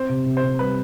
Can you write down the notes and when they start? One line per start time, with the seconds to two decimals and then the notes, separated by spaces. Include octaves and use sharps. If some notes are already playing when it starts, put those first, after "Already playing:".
Already playing: C4 C5
0.09 C3
0.26 C3
0.37 C5
0.43 C3
0.59 G3 B4